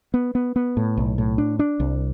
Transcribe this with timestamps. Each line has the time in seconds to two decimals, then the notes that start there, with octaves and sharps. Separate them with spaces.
0.14 B3
0.35 B3
0.56 B3
0.77 A2
0.97 B1
1.18 A2
1.38 D4
1.59 D4
1.80 C2